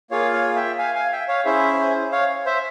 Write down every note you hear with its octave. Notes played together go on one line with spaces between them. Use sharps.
A#3 F4 G#4 C#5 F5
C#5 F5
E5 G5
F5 G#5
F5 G#5
E5 G5
C#5 F5
C#4 E4 G#4 C5 E5
C5
C#5 F5
C5 E5